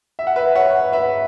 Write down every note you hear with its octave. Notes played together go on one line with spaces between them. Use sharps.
E5
F#5
B4 E5
C#5 F#5
B4 E5